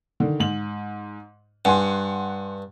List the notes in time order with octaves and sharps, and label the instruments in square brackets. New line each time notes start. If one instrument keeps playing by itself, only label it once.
[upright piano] D3 D#3
G#2 F#7
[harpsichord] G2 [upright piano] F#5 G#5 C6